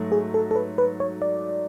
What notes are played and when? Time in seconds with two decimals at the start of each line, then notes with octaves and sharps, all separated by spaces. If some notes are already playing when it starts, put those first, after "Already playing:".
Already playing: G#2 F#3 A3
0.12 G#4
0.34 A4
0.51 A4
0.56 B4
0.78 B4
1.00 C#5
1.22 D5